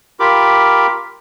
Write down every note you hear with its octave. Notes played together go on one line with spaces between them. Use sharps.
F4 G4 A#4 B5 D6